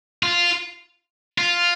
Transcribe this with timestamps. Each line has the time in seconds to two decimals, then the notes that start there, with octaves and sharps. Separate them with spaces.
0.23 F4
1.38 F4